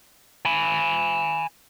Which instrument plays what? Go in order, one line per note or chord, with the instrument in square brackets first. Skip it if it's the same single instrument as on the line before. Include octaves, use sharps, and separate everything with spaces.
[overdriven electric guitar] G#5 B5